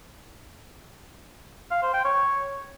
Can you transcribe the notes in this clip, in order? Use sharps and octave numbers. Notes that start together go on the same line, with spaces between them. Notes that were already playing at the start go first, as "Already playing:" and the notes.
F5
C5
G5
C#5